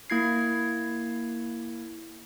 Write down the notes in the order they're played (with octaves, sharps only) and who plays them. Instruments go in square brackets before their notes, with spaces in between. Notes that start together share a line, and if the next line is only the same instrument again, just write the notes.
[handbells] A#3 E4 G#6 C7